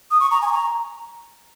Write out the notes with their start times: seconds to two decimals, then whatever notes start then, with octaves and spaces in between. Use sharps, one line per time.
0.11 D#6
0.20 C#6
0.31 A#5
0.42 G#5
0.47 C#6
0.52 A#5